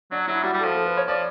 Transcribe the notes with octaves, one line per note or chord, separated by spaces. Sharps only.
F#3 D4
F#3 E4
G3 F#4
G3
A4
F3
A4
B4
C#5
F3 D5